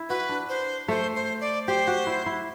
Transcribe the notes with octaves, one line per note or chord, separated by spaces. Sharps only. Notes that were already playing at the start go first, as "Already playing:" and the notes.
Already playing: E4
F#4 B4
D4
C5
A3 C5
C5
D5
G4 C5
F#4
E4
E4